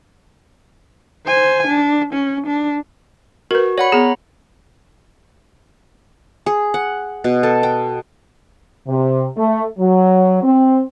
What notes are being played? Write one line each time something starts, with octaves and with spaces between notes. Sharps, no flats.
C5 G#5
D4
C#4
D4
F#4 A#4 B4
C#5 D5 F#5 B5
B3 G#4 A#5
G#4
F#5
B2
A4
G5
C3
A3
F#3
C4